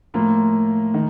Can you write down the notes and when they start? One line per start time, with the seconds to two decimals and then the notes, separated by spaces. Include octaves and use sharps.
0.14 A2 F3 A#3 F4
0.94 D#3